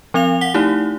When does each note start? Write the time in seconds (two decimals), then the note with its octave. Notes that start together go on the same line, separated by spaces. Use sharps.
0.14 F3 C4 F5 F7
0.41 F#5 B6 G7
0.54 A3 D#4 E4 G4